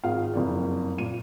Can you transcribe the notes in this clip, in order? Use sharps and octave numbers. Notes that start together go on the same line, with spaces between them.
G#1 G#3 F4 F5
F#1 F2 D5
A#2 D#7